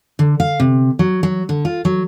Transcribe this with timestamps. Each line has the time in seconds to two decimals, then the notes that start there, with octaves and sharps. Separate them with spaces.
0.19 D3
0.40 F5
0.60 C3
0.99 F#3
1.23 F#3
1.49 D3
1.65 F4
1.85 F#3